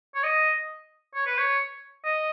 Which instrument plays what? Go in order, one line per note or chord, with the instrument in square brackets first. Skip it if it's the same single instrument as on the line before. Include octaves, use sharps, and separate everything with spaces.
[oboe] C#5
D#5
C#5
B4
C#5
D#5